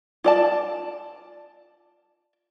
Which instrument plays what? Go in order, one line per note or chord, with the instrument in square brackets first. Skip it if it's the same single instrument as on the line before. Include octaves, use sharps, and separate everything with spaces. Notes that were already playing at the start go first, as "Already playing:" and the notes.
[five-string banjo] F4 D5 A5